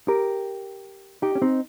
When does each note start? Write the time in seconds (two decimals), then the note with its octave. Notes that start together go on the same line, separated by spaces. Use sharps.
0.08 G4 A#4
1.22 D#4 G4
1.35 C#4
1.42 C4 D#4